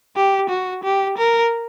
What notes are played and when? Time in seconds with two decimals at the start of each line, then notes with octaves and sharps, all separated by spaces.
0.16 G4
0.49 F#4
0.84 G4
1.18 A#4